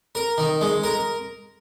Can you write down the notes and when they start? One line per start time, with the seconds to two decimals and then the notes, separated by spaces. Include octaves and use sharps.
0.15 A#4
0.38 D#3
0.61 G#3
0.84 A#4